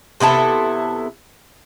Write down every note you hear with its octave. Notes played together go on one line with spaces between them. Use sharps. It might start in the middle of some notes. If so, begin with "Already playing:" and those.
C3 B3 E4 A4